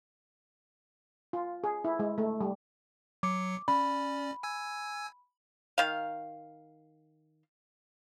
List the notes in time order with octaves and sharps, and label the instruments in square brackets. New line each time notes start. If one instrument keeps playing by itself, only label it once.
[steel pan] F4
G#4
E4
G#3
A3
G3
[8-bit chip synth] F#3 C#7 [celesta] D6
[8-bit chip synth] C#4 D5 [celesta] B5
[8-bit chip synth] G#5 E6 G#6
[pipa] D#3 F5